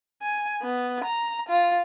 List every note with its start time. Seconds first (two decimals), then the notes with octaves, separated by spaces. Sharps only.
0.22 G#5
0.62 B3
1.04 A#5
1.49 F4